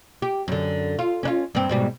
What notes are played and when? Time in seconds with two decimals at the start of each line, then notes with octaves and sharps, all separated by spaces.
0.22 G4
0.48 F#2 D3
0.99 F4
1.23 C#4 D4 F4
1.55 G2 C4
1.69 G#2 B2 G3